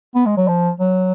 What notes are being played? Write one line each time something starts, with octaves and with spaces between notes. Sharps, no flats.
B3
G#3
F#3
F3
F#3